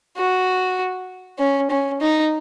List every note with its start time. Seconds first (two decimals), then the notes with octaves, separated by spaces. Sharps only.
0.17 F#4
1.39 C#4
1.70 C#4
2.01 D#4